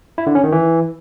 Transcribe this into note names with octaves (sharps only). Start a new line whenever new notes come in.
E4
D3
C#4
D#3
E3